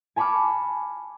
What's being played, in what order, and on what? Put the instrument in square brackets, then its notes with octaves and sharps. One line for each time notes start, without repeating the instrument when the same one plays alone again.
[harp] G#5 A5 B5 C#6 D6 F6